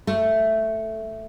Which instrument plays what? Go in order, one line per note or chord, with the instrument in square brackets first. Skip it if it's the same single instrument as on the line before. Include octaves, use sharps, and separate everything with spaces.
[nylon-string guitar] A3